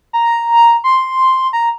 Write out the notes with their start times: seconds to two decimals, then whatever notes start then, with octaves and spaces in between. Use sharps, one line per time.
0.13 A#5
0.84 C6
1.53 A#5